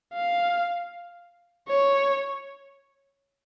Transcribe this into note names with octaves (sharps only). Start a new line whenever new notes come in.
F5
C#5